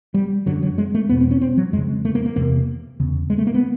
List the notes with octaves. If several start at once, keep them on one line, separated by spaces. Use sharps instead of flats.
G3
F#2 D3 F#3
F#3
G#3
A3
E2 B2 B3
C4
C#4
C4
F#3
F2 C#3 G#3
A3
A#3
A#3
E2 C3 A#3
E2 C#3
G#3
A3
A#3
B3